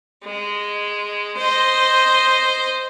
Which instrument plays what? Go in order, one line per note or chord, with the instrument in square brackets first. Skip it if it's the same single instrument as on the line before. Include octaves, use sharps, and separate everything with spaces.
[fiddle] G#3
C5 D#5